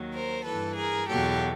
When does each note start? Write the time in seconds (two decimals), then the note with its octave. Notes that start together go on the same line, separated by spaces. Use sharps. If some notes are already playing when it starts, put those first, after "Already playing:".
Already playing: D#2 D#3 F#3
0.14 A#4 C5
0.45 G2 E3 A4 B4
0.76 G#4 A#4
1.08 E2 B2 F#3 G4 A4